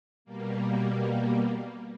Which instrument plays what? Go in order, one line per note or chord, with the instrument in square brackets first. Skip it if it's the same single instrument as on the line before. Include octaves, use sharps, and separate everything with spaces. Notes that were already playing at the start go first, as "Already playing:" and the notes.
[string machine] B2 G3 A#3